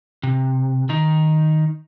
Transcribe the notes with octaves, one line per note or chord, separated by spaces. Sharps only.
C3
D#3 D#4